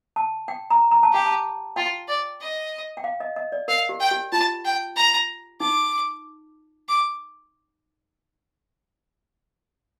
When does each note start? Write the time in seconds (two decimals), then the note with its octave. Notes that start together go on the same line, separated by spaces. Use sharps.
0.16 A5
0.48 G5
0.70 A#5
0.91 A#5
1.03 A5
1.13 G4 G5
1.25 A5
1.76 F4 G5
2.08 D5
2.41 D#5
2.97 G5
3.04 F5
3.20 D#5
3.36 D#5
3.52 D5
3.68 A#4 F5
3.89 G4
4.00 G5
4.11 G4
4.32 F4 A5
4.65 G5
4.96 A#5
5.60 D#4 D6
6.89 D6